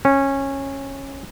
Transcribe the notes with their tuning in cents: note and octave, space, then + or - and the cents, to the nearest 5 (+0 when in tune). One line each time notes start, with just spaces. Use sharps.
C#4 -15